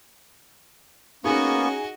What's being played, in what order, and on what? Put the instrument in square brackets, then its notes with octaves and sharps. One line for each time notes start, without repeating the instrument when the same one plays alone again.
[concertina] A#3 B3 C#6 [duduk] C#4 [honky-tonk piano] D#4 G#4 [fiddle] F#4 D#5